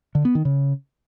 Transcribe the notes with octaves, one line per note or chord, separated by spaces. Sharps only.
D3
B3
D#3
C#3